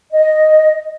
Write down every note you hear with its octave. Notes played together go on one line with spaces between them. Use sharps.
D#5